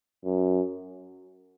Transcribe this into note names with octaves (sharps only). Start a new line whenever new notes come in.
F#2